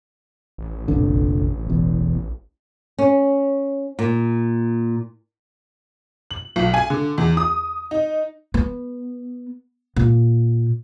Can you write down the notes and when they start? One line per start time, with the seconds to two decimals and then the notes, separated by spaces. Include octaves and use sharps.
0.58 A1
0.88 F1 A#1 D3
1.67 E1 E2
2.99 C#4
3.99 A#2
6.31 F#7
6.56 B1
6.74 G#5
6.90 D3
7.18 E2
7.37 D#6
7.91 D#4
8.54 B3
9.96 A#2